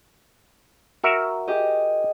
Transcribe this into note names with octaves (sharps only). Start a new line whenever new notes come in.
F#4 A#4 E5
G4 G#4 D#5